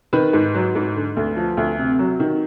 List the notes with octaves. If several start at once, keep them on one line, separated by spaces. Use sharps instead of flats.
D#3 B4
G#2
F#3
G#2
D3
D2
F3
D2
C3
F#3
D#3